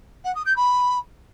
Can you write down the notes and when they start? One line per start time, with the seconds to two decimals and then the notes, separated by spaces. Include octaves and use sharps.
0.24 F#5
0.35 D#6
0.45 G6
0.56 B5